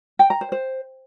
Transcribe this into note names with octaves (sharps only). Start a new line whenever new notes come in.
G5
A#5
C5
C5